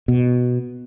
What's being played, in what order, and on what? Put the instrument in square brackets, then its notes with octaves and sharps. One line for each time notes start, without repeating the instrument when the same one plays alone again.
[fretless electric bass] B2